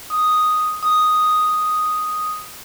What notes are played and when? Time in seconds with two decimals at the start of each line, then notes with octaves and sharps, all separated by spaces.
0.10 D#6
0.83 D#6